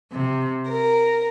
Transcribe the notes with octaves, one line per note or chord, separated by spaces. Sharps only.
C3
A#4